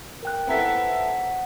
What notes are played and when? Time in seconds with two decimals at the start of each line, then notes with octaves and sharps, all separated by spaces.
0.23 A#4 G5 F#6
0.47 B3 E4 A4 C5 F#5 A#5 B6